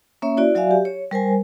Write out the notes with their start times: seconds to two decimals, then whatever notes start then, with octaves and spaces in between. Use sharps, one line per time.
0.22 A#3 C#4 C#5 E5
0.37 E4 F#4 D5
0.55 F#3 F#4 D5 E5 F5 G#5
0.71 G4
0.85 C#5
1.11 G3 A#4 C5 G#5